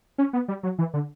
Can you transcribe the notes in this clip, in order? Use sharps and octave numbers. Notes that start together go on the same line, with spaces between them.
C#4
B3
G3
F#3
E3
D3